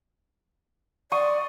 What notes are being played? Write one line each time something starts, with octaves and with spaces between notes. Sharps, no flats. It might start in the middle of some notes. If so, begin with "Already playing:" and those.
D5 C6 C#6 D#6